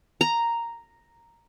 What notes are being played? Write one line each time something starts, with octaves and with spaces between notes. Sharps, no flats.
A#5